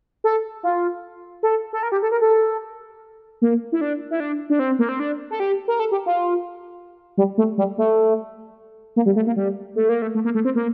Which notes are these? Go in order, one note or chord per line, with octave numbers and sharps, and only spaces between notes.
A4
F4
A4
A4
A#4
G4
A4
A#4
A4
A#3
E4
D4
E4
D4
D4
C4
A#3
C4
D4
A4
G4
A#4
A4
G4
F4
G3
A3
G3
A3
A#3
G3
A3
A#3
G3
A3
A#3
A3
A3
A#3
A3
C4
A#3